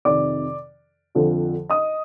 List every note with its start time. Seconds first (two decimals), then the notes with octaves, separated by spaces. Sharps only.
0.05 F2 C3 D#3 D5 D6
1.15 F2 D3 F3
1.69 D#5 D#6